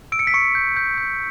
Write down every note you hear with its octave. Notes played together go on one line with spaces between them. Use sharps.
E6 D7
C#7
B6
C#6 C#7
G6
G6
G6